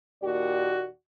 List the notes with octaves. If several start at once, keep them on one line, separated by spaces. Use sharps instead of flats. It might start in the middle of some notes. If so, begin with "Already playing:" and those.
D#2 A#2 F#4 G4 D5